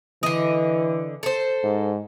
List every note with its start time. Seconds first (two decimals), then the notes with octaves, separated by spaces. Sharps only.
0.23 D3 E3 D#5
1.23 A4 C5
1.63 G#2